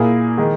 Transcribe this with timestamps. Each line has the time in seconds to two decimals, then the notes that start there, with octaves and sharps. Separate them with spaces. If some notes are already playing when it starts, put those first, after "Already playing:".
Already playing: A#2 A#3 E4 G#4
0.37 D#3 G#3